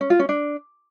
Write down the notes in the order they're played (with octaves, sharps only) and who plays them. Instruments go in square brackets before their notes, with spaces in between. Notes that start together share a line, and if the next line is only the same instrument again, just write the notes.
[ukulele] C#4
F4
C#4
D4